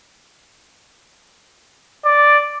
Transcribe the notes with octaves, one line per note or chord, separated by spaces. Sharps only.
D5